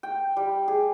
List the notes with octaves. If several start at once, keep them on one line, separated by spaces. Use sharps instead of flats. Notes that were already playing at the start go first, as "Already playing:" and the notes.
G5
G3
G#4